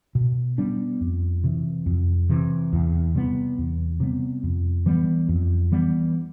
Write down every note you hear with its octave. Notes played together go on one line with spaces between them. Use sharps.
B2
G3 B3 D4
F2
C3 E3
F2
C3 E3
E2
C3 G3 B3
E2
C3 G3 B3
F2
E3 G3 B3
F2
E3 G3 B3